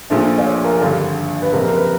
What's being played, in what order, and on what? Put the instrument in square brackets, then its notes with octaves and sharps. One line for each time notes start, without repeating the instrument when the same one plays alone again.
[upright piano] A#1 A#2 F3 A3 D4
[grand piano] D5
C#5
A#4
[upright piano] G#1 G2 D3 [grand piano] A4
[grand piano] B4
[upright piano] F#1 F2 C3 [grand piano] A#4
[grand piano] A#4
B4